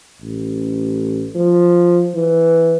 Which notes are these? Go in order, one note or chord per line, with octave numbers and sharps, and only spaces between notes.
A1
F3
E3